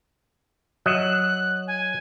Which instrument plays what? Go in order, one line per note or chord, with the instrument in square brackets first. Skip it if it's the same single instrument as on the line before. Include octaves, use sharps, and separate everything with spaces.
[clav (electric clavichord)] F#3 D#5 E5 [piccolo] F#6
[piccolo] G#5